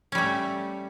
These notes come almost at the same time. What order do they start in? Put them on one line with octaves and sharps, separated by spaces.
C#4 G3 A3